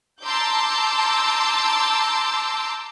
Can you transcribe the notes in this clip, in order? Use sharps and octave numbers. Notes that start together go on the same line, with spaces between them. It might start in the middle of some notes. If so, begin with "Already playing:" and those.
A5 A#5 C6 D6 E6 G6